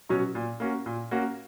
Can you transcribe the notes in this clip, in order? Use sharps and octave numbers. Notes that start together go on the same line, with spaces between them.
B2 F#3 C#4
A#2
A#3 C#4 F#4
A#2
A#3 C#4 F#4